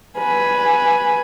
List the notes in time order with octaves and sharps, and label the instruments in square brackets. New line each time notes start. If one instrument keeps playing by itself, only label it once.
[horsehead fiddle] B4 G#5